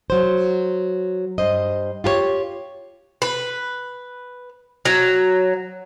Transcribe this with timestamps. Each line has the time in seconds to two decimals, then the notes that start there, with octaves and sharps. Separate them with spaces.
0.10 F#3 C5
1.38 G2 C5 D#5
2.04 F4 G4 A#4 C#5
3.22 B4
4.85 F#3